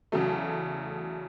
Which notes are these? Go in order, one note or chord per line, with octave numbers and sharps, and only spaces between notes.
E2 C#3 F#3 A3